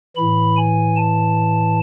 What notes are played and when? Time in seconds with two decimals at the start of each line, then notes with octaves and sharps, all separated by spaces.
0.16 A2 E3 B5
0.56 G#5
0.96 A5